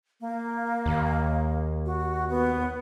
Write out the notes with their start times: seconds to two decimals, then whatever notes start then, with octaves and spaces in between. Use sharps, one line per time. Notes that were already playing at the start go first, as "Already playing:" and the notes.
0.21 A#3
0.86 D#2
1.86 F#4
2.29 B3